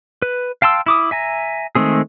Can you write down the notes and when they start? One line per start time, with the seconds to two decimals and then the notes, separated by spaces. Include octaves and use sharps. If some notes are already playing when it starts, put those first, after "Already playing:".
0.22 B4
0.62 F5 G5 A5 C6 E6
0.86 E4 D6 D#6
1.11 E5 G#5 A#5
1.75 D#3 G#3 A3 C4 G#4